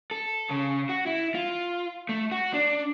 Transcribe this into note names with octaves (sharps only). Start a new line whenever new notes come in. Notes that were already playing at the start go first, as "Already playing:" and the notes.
A4
C#3
F#4
E4
F4
A3
F#4
D4